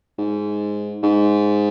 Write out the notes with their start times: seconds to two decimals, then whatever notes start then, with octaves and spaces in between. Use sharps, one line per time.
0.19 G#2
1.03 G#2